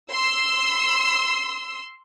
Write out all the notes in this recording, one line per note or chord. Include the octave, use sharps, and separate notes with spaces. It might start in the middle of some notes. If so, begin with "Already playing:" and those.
C6 E6